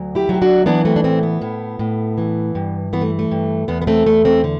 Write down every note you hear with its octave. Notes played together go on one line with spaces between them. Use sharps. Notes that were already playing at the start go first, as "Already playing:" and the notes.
Already playing: D2 F#3
E4 G4
F#3 G4
D4 F#4
E3 B3 D4
A3 C4
D4
A2 A3 C4
B3
A2
A2
E3
G2
E3 B3
A3
A3
G2
E2 B3
B3
A3 C4
E2 A3
A3 C4
D3